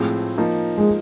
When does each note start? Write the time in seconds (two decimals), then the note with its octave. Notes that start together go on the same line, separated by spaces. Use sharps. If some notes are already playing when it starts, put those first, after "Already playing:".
Already playing: A2 F3 G#3 C4
0.38 F3 A#3 D#4
0.78 G#3